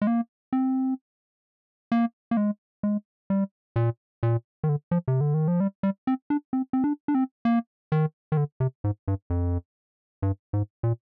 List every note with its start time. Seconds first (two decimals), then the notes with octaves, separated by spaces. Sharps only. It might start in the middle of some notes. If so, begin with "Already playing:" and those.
0.02 G#3
0.07 A#3
0.53 C4
1.92 A#3
2.31 A#3
2.37 G#3
2.83 G#3
3.30 G3
3.76 A#2
4.23 A#2
4.64 D#3
4.69 D3
4.91 F3
5.08 C3
5.21 D3
5.34 D#3
5.48 F3
5.60 G3
5.83 G3
6.07 C4
6.30 D4
6.53 C4
6.73 C4
6.84 D4
7.08 D4
7.15 C4
7.45 A#3
7.92 D#3
8.32 D#3
8.37 D3
8.60 C3
8.84 G#2
9.08 G2
9.30 F2
10.22 G2
10.53 G#2
10.83 A#2